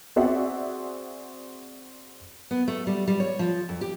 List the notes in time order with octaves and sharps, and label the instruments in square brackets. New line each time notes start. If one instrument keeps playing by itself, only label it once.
[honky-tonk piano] C4 F#4 G#4 D5 E5 F#5
[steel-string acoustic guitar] B3
A3
G3
G3
C#5
F3
F2
G4